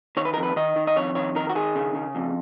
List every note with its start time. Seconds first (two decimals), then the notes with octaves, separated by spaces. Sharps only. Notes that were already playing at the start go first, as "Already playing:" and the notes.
0.17 D#3 C#5
0.25 B4
0.34 F2 A#4
0.43 B4
0.56 D#3 D#5
0.76 D#3
0.87 D#5
0.96 F2 C#5
1.15 D#3 C#5
1.35 D#3 A#4
1.49 F#4
1.55 D#3 G#4
1.76 C#3
1.95 C#3
2.15 F2